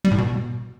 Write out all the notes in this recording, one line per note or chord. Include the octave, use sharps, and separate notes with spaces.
G3
A2
B2